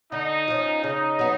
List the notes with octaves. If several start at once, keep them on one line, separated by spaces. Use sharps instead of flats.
D3 D#4
F3 A3 C#4
C#3 D#4
F#3 B3